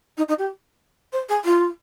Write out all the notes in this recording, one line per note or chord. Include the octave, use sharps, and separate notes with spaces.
D#4
D#4
G4
C5
G#4
F4